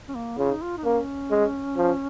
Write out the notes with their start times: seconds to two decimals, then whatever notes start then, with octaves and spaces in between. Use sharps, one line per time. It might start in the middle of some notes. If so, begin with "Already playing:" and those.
0.08 C#4
0.15 A#3
0.38 C#3 F4
0.50 D#4
0.62 F4
0.78 D#4
0.85 A#3 C#4
1.31 G#3
1.77 F3